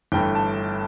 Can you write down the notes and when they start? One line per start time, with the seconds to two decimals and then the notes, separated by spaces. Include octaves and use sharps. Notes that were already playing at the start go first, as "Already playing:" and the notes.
0.12 G1 G2 E3 A3 G5
0.35 A5